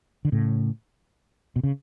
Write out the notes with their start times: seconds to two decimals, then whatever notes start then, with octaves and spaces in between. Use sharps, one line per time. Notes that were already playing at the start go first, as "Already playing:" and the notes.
0.25 D3
0.32 A2 C#3
1.56 B2
1.64 C#3